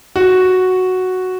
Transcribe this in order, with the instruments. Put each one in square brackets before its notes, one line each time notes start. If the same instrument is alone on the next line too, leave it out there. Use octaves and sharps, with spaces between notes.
[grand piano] F#4